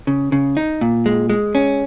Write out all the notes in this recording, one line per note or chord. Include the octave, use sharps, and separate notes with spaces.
C#3
C#3
D#4
A#2
G#3
G#3
C#4